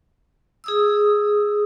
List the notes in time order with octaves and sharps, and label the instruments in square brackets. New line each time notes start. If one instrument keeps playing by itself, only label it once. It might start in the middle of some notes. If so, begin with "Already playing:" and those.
[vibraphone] G#4 D#6 E6